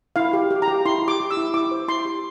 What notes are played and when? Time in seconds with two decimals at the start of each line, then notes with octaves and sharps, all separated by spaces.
0.16 E4 F5
0.33 G4
0.51 G4
0.62 A#5
0.68 G4
0.85 E4 C6
1.02 G4
1.08 D6
1.20 G4
1.31 E6
1.37 E4
1.54 E4 D6
1.71 C5
1.88 E4 C6
2.05 G4